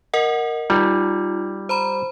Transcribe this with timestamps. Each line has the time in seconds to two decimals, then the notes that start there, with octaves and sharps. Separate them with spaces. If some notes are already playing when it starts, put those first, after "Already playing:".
0.14 A#4 D#5 F#5
0.70 G3 D#4 F4
1.69 C5 A#5 B5